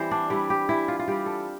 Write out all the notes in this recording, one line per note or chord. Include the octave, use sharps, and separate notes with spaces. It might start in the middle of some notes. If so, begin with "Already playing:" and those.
Already playing: E3 G3 C4 C5
D4
G3 C4 E4
G4
E3 E4
F4
F4
G3 C4 G4
A4